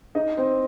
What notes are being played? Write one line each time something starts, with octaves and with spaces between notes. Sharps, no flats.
D#4 D#5
C4 C5